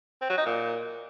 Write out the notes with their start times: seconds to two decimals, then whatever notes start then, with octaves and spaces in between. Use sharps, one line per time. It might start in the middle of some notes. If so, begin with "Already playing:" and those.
0.22 C4
0.30 F#3
0.38 D#4
0.46 A#2